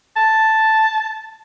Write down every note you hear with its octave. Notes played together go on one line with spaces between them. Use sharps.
A5